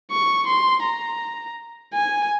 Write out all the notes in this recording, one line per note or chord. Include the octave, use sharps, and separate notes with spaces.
C#6
C6
A#5
G#5